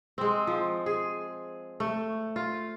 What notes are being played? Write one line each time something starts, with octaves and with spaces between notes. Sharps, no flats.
G#3 C4
F3
G#4
A3
F4